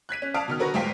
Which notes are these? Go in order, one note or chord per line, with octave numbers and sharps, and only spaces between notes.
F#6 G#6 B6 D#7
C#4
D5 F5 A5 D#6 F6 D7
B2 D#3 F6
D3 F#4 A#4 B4 C#6 A#6
G1 G#2 C5 F5 G5 B6